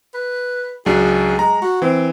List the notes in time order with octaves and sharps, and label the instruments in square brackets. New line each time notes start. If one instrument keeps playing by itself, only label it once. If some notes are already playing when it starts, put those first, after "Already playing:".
[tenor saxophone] B4
[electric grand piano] C#2 F#3 D4 [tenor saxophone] G#4
[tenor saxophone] G#3 [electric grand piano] A#5
[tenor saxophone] F#4
[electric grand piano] E3 [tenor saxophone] C4